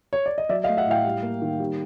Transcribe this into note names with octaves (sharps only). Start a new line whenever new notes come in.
C#5
D5
D#5
F#3 D5 E5
D#5 F5
A3
E5 F#5
A2 F5 G5
G3
A#3
D#3
G3